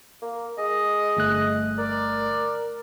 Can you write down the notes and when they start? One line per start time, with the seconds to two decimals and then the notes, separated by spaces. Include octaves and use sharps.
0.22 A#3
0.58 G#3 D#5
1.17 G1 A3 F#6
1.78 A#4 D5